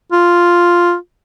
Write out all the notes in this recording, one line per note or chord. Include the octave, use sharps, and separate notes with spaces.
F4